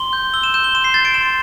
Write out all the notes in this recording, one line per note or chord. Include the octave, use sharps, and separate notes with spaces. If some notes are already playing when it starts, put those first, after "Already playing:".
Already playing: C6 G7
G6
E6 G7
E7
G6 E7
G7
C6 E7
C7
G6 A6
D7
C6 E7